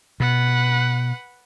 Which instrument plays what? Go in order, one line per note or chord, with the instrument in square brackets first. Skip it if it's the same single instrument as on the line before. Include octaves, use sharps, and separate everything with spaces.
[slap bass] B2 [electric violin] B4 F#5